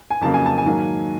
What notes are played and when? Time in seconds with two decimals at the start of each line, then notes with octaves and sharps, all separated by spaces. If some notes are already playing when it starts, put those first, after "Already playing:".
0.10 G#5
0.21 F2 C#3 F#3 A#3 A5
0.34 G#5
0.46 A5
0.58 G#5
0.65 G#2 D#3 F#3 A#3